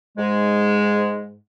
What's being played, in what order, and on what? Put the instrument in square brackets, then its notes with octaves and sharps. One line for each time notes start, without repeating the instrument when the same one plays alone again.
[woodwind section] G#2 G#3